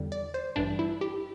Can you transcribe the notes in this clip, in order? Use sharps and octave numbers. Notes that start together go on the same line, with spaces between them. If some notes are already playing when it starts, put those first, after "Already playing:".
Already playing: E2 D3 G3
D5
C5
A1 G2 E3 G3 D4
E4
G4